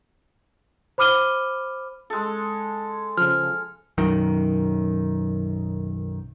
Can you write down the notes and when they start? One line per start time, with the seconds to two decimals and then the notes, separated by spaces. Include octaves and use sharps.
0.98 C5 B5 D6 F6 D#7 G7
2.10 G#3 A4
3.18 C#3 F3 F6
3.98 B1 F#2 D#3